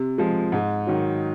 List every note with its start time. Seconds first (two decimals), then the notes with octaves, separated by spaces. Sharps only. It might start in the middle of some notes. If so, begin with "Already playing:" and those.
Already playing: C3
0.18 F3 G#3
0.52 G#2
0.87 D#3 F#3